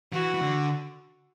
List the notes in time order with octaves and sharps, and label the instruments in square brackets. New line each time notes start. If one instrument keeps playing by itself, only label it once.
[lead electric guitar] E3 [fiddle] F#4
[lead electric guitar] E3
D3